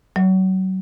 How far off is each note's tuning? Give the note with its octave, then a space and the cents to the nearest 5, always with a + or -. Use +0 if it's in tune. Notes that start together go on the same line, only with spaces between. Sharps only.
F#3 +30